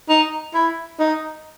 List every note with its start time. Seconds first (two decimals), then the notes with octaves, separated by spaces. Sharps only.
0.09 D#4
0.54 E4
0.99 D#4